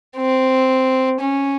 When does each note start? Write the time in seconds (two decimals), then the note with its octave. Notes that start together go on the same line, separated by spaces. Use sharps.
0.17 C4
1.20 C#4